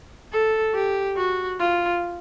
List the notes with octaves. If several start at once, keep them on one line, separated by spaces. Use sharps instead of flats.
A4
G4
F#4
F4